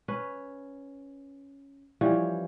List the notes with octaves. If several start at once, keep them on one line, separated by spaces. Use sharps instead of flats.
C#4 B4
E3 F3 G3 C#4